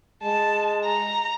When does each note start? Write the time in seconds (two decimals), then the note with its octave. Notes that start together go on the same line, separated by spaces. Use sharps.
0.23 G#3 A5
0.85 A#5